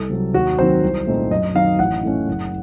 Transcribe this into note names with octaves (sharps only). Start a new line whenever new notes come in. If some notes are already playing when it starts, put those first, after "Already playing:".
Already playing: C2 A4
C3 F#3
D#2 F#4
D#3 F#3 C4 C5
C2
A#2 A3 C4 D#4
F#2 D#5
D#3 F#3 C4 D#4 F5
A1 F#5
A2 A3 C#4
F#1